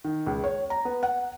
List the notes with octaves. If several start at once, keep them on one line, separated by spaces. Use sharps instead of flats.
D#3
C#2
C#5
A#5
B3
F#5